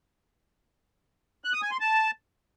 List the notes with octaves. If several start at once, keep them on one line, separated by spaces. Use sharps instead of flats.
F#6
D#6
G#5
C6
A5